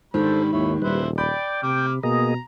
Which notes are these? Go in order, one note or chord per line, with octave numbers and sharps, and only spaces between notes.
G#2 D3 D#3 G3 A4 C5 B5
D#2 E4 C#5 B5
D#1 G3 E4 B4 C5
D5 G5 B5
C3 D6 F6
B2 A#3 G#4 D#5 A#5